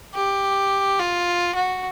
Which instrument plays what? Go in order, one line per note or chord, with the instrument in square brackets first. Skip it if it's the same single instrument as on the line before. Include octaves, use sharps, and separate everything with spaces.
[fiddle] G4
F4
F#4